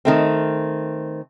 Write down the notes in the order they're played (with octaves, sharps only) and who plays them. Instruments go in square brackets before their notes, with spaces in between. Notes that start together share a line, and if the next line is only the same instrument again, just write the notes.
[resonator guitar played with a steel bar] D#3 A3 C4